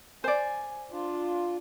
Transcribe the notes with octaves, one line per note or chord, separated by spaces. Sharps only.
C5 D5 G#5
D4 F4